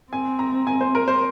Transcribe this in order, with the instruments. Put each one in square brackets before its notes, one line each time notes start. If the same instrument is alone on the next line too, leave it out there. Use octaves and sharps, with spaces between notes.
[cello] C4 [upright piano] G#5
[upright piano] A#5
G#5
C5
A#4
C5